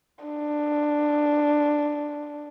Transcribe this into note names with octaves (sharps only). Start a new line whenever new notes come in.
D4